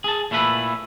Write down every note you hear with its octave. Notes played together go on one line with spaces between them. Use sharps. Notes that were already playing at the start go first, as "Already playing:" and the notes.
G#4 A5
A#2 A3 E4 A4 B4